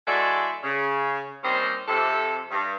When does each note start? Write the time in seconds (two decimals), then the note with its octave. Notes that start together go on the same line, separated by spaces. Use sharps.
0.08 E2 G#3 F#4 A4 D5 E5
0.63 C#3
1.44 D#2 G3 C4 C#4 C5 D#5
1.88 F2 C3 A4
2.51 G2